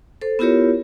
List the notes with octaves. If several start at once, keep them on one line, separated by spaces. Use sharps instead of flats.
A4 C5
B3 E4 F4 G4 A#4 C#5